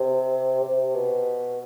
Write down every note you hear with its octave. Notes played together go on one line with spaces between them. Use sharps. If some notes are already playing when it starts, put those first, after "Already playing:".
Already playing: C3
C3
B2